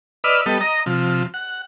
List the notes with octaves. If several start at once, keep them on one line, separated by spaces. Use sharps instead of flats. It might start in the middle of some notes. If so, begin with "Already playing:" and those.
B4 D5 D#5 E6 F6
G3 B3 A4 D#5
D#5 A#5 D#6
C3 F3
F#5